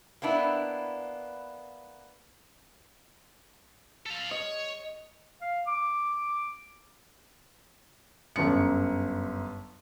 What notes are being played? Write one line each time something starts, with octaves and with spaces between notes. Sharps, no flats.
A#3 B3 D4 E4
A4 F5
C#5 D#5
F5
D6
G1 F#2 C#7